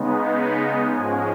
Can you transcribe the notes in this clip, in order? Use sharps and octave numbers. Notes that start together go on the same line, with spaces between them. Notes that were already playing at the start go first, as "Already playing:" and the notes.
Already playing: C#3 G#3 B3 D#4
B5
G#2 F3 G#3 C#4 G#5